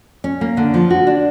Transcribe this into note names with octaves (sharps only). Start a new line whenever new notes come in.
C#4
A#3
D3
F3
F#4
D4